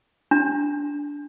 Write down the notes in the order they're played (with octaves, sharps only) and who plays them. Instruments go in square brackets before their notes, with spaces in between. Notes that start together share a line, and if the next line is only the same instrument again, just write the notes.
[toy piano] D4